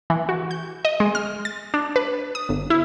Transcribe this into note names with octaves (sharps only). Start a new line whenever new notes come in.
E3
F#4
G6
D#5
G#3
F6
A6
D4
B4
D#6
G1
E4